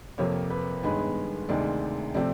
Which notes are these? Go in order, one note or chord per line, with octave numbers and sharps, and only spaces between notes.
F2 C3 F3 A#3 C#5
B4
G1 G2 D#3 G#3 B3 B4
D2 C3 D#3 G#3 D5
C3 F3 A3 C4 D5